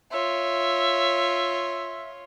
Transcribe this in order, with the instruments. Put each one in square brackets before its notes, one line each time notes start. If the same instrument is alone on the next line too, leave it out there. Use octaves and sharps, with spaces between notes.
[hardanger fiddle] F4 C#5 [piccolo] E5